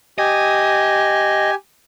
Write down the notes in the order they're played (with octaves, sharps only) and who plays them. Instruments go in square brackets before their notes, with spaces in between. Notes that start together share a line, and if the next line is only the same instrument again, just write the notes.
[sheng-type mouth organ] G4 G#5 [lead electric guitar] D#5